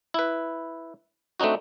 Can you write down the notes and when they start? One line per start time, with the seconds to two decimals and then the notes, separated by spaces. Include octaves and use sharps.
0.14 E4 B4
1.40 A3 C4 D4 D#4 F#4